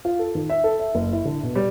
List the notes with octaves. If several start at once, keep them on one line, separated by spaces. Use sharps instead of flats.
F4
A4
D#3
E5
A4
E5
F#1
E4
D3
B2
G3